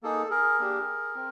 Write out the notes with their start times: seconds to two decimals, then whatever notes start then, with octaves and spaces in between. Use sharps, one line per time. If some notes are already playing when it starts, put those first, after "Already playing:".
0.03 A#3 D#4 G#4 A4
0.30 G#4 A#4
0.59 A#3 D4 G4
1.15 C4